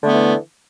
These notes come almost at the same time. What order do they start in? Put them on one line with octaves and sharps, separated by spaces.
D3 A3 B3 E3